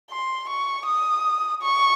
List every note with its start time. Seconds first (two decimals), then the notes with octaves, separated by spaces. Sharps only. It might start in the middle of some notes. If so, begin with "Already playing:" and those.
0.10 C6
0.48 C#6
0.86 D#6
1.62 C#6